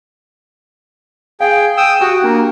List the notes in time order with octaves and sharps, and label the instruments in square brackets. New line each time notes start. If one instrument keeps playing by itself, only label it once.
[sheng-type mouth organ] G#4 G5 [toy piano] F5
[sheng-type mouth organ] G5 D#6 E6
[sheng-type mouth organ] F#4 [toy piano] G4 G5 D#6
[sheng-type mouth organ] A#3 [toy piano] D4 A#5